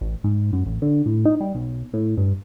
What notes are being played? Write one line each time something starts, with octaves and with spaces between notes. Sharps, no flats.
A1
G#2
F#2
A1
D3
A2
D#4
G3
B1
A2
G2